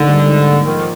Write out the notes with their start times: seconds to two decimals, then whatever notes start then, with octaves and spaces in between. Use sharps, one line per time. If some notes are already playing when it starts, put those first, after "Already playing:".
Already playing: G#2 D3 A#3 D#4
0.08 G3
0.28 G#2
0.47 A#3
0.66 D#3 F3